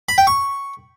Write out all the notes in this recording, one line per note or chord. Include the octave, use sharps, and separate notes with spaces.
B5
G5
C#6